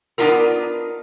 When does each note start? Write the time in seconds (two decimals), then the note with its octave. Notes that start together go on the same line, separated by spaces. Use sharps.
0.18 B3 D4 D#4 F4 A#4